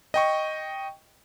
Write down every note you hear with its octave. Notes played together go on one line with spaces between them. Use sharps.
D#5 G5 C#6